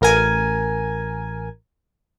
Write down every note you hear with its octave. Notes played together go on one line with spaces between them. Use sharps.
A1 A#4 G#5